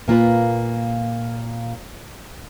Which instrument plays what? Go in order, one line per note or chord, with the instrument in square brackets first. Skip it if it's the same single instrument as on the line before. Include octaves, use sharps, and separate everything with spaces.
[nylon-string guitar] A#2 A#3 F4 B4